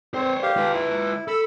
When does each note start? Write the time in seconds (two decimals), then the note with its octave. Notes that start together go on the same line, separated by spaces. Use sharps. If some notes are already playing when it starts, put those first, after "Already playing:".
0.14 C4 C5 C#5
0.43 G4 F5
0.57 F4 B4
0.74 E4
1.28 A4 B5 E6